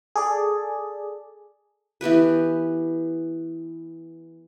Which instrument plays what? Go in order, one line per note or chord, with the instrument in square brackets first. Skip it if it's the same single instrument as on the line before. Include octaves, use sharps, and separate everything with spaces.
[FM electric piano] G#4 A4 D5
[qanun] E3 B3 G4 B4